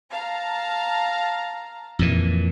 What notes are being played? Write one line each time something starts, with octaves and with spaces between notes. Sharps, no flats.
F5 A5 A#5
F2 A#2 E3